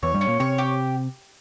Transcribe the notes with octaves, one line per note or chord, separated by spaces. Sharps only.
E2 E3 C#5
G2 G3
C#4
A#2 A#3
C3 C4 C#5
G4